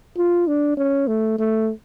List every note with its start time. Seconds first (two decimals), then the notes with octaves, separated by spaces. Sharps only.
0.18 F4
0.48 D4
0.77 C#4
1.08 A3
1.39 A3